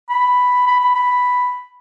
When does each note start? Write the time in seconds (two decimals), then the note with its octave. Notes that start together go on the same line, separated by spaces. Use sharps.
0.10 B5
0.67 B5
0.80 B5
0.95 B5